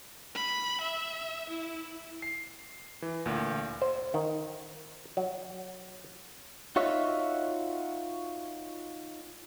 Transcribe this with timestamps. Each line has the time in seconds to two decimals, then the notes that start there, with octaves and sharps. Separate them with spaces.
0.35 B5
0.81 E5
1.50 E4
2.22 C7
3.02 E3
3.25 D2 A#2
3.82 C5
4.14 D#3
5.17 F#3
6.76 D#4 F4 F#4 C#5 E5